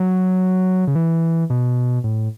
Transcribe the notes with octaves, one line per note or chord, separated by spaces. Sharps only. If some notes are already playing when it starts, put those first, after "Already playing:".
Already playing: F#3
C#3
E3
B2
A2